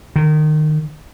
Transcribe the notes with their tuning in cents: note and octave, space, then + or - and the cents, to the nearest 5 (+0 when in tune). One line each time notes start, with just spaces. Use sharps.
D#3 -25